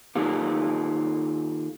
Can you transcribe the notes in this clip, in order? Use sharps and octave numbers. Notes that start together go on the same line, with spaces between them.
D#3 A#3 D#4 F4 G4 A4